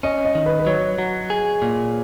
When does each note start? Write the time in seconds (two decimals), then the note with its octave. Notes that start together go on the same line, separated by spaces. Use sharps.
0.03 C#4 D#5
0.25 D#5
0.35 D#3
0.46 B4
0.59 B4
0.66 F#3 C#5
0.98 F#3
1.30 G#4
1.62 A#2